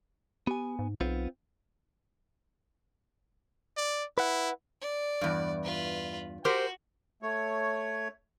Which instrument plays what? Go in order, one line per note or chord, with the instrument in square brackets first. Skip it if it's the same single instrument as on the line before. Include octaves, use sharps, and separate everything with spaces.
[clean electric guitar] B3 G#5 [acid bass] G4
[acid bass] G#2
[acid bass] B1 [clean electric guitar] B3 C4 F4
[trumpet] D5
[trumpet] E4 [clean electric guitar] B4 F#5
[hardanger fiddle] D5
[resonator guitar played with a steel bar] E2 G2
[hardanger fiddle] F4 B4
[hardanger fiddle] F#4 [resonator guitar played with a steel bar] G4 A#4 C5
[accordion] A3 C#5